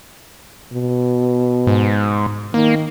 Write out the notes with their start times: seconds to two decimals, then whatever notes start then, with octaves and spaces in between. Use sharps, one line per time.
0.73 B2
1.67 G#2
2.54 D#3 A#3